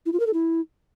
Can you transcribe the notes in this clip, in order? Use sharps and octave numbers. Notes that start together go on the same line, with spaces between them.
E4
F4
A#4
A4
E4